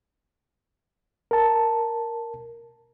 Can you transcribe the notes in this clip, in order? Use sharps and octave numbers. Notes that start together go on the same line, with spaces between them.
A#4 A5